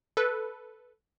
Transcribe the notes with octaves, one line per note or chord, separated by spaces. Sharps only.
A4 B4